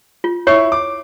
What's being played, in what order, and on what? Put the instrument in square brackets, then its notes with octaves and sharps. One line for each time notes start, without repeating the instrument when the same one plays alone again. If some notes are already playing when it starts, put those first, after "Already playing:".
[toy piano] F4
[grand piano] E4 C#6 C7 [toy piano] C#5
[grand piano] D6